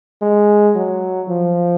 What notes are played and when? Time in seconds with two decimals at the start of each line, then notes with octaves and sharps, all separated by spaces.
0.22 G#3
0.76 F#3
1.29 F3